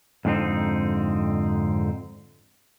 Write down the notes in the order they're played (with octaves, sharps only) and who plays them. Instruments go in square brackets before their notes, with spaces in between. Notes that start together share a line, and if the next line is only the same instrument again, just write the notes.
[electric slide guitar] F2 G#2 D3 C4 D#4